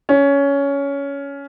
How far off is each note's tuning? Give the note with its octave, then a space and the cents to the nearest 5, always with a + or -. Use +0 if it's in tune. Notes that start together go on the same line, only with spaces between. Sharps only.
C#4 +15